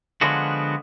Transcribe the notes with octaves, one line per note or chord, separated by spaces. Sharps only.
D3 F3 G#3 B3 D4 F#4